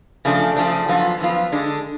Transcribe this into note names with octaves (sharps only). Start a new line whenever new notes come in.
C#3 F3 A3 D4
C#3 F3 A3 D4
F#2 F3 B3 F4
F#2 F3 B3 F4
D3 G#3 D4